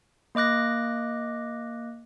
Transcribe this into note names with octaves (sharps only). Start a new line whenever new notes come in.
A#3 D#5 D6 F#6 A#6